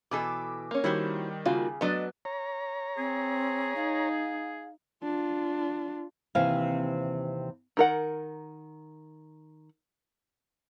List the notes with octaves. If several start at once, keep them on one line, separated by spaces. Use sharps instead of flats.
B2 E3 A4 D6
A#3 C#4
D#3 G3 E4 F#4 C5
C#3 A#3 F4 F#4
F#3 A3 B3 D4 D#5
C#5 A#5
C4 G#4
D#4 F5
D4 F4
D#2 C3 E3 C4 F5 G#5
D#3 A#4 F#5